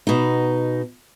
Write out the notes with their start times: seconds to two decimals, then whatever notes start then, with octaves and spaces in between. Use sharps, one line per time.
0.07 B2 D#4